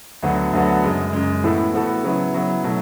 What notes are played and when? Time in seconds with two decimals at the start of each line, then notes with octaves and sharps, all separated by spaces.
0.23 D2 D3 F#3 B3 F#4
0.53 D2 D3 F#3 B3 F#4
0.83 F#2 C#3 G#3
1.13 F#2 C#3 G#3
1.44 A2 E3 B3 F#4 A4
1.74 A2 E3 B3 F#4 A4
2.04 C#3 F#3 B3 E4
2.33 C#3 F#3 B3 E4
2.64 B2 F#3 A3 E4